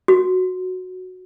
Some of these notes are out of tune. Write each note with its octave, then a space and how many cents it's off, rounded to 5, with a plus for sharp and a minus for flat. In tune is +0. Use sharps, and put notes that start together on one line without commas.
F#4 -5